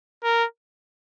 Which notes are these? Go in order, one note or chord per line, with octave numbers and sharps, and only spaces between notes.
A#4